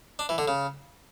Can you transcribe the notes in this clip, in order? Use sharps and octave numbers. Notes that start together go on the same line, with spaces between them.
D4
E3
D3
C#3